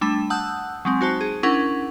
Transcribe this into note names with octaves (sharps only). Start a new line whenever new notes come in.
G3 A3 D4 B5 E7
F#5 A5 D#6 E6 F#6 G6
F#3 G#3 C4
D#4 F#4 C5 A5
G#4
C#4 D4 E4 A#4 F#5